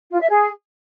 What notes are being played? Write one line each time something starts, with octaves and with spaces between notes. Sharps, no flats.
F4
E5
G#4